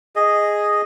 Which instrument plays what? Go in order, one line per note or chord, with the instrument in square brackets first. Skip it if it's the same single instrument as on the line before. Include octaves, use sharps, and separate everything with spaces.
[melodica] G#4 D#5